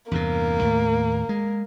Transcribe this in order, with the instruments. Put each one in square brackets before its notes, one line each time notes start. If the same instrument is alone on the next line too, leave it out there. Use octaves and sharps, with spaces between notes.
[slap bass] E2 G2 C3 [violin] A#3
[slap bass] D#2 A2 A3
G#3